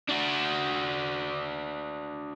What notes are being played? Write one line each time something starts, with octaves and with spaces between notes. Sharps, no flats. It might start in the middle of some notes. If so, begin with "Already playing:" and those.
D4 F#4